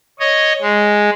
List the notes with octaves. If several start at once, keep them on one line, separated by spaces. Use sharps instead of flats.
C#5 D#5
G#3